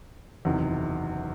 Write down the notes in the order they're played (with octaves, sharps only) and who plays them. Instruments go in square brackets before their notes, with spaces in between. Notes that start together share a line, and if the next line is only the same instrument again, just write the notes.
[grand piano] F#1 E2 C3 D#3 F#3